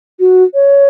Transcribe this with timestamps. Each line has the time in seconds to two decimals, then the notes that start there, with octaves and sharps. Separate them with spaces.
0.20 F#4
0.54 C#5